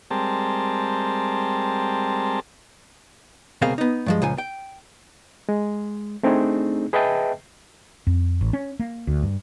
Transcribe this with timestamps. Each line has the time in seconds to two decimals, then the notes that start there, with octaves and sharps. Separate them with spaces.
0.11 G3 G#3 C4 A#4 A5
3.62 C#2 B2 A#3 C4 G#4 F5
3.78 B3 D#4
4.06 G2 F3 G#3
4.22 C#2 A#2 F3 G#5
4.38 G5
5.49 G#3
6.23 A3 C4 D4 D#4 G#4
6.93 G#4 B4 D#5 E5 G5 A5
8.07 F2
8.41 A1
8.53 C#4
8.79 A#3
9.07 D2
9.23 G2